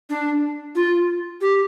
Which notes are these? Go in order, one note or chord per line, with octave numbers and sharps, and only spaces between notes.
D4
F4
G4